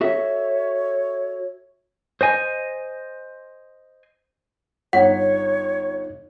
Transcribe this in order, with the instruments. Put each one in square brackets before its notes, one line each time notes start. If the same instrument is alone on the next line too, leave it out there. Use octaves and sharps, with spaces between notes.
[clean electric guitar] F#4 A4 E5 [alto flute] C#5
[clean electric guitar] C5 D#5 G#5
[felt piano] G1 [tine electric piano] D#4 F4 [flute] C#5 [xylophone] F#5